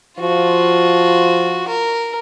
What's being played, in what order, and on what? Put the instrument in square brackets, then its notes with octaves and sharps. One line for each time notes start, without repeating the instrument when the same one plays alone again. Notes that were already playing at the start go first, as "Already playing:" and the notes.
[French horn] F3 [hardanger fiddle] F4 F#4
[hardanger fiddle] A#4